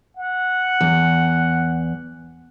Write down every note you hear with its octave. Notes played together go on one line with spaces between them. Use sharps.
F#5
E2